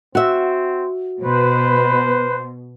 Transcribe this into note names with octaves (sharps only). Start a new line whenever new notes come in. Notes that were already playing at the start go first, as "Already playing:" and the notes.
C4 F#4 E5
B2 B4 C5